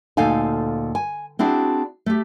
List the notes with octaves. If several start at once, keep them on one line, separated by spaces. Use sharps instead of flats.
D2 A#2 D#4 A4 F5 G#5
G#5
C4 D4 E4 F#4 G#4
A3 G4